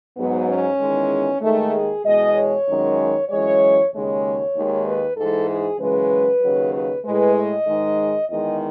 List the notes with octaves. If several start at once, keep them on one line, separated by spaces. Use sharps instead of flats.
G#2 F#3 B3
C#4
E2 D#3 G#3
D#2 D#3 G#3 A3
G#4
E2 B2 G#3 D#5
C#5
F#2 D#3 G#3
F#2 E3 G#3 C#5
D#2 C#3 G#3 C#5
D#2 D#3 G#3
B4
G#2 E3 G#3 A4
G#4
F#2 C#3 E3 G#3 B4
D#2 C#3 F#3
B4
A2 G#3 B4
D#5
G#2 D#3 G#3
E2 D#3 G#3 D#5